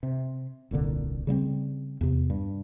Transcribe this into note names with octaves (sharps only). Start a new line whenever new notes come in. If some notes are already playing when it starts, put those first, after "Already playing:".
C3
D#1 C2 A#2 D3
C#3 G3 A#3 C4
E2 C3
G2